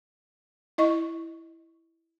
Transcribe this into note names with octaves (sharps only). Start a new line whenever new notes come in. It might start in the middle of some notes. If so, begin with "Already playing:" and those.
E4 D#5 C#6